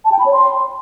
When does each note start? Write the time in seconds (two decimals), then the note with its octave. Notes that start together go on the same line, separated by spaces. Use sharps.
0.05 A5
0.12 G5
0.19 B5
0.26 C#5
0.33 C6